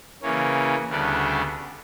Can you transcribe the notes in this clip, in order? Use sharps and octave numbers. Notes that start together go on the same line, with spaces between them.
C#3 E3 A#3 C#4
D2 C#3 G3 B3 D4